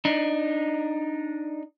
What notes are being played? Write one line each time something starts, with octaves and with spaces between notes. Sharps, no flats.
D4 D#4